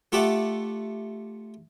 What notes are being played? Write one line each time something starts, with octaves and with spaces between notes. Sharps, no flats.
A3 F4 G4 D5 E5 F#5